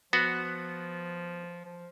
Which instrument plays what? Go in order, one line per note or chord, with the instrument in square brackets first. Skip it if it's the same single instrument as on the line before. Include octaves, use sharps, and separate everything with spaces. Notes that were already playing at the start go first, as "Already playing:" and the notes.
[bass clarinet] F3 [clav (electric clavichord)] B3 F#4
[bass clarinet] F3